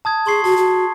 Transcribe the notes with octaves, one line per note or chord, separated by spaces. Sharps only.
A5 D#6 G#6
G#4 C6 C#6 C7
F#4 A5
F#4